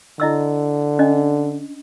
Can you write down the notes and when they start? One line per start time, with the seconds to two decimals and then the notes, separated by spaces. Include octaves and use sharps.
0.20 D3 E4 D#5 E6
0.99 C#4 D4 D#5